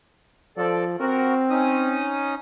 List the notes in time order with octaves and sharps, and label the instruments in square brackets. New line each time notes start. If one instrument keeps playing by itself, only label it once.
[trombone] F3 [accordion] C4 A4 D5
[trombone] C4 [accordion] F#4 A#4
[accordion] C#4 D#4 D#6